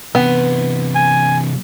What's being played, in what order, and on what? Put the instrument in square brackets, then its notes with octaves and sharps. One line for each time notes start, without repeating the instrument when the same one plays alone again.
[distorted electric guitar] C3 E3 [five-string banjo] B3
[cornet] G#5